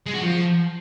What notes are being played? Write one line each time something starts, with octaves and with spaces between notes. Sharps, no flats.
G#3
F#4
F3